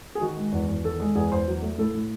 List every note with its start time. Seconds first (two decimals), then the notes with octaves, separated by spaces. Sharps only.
0.15 G#4
0.21 D#3 F#4
0.37 G#3
0.52 E2
0.68 E2
0.85 D#3 A4
1.00 G#3
1.15 E2 G#4
1.31 E2 C5
1.48 F#3
1.62 A3
1.78 A2 A4
1.95 A2